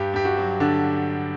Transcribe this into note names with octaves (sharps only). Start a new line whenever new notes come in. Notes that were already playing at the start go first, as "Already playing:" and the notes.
Already playing: G2 G4
G2 G4
F#4
F#3
D3 D4